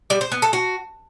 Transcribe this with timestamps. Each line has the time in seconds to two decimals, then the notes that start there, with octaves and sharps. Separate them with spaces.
0.10 G3
0.21 C5
0.32 B3
0.42 A4
0.53 F#4